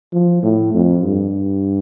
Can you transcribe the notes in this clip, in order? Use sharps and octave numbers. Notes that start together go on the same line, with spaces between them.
F3
A2
F2
G2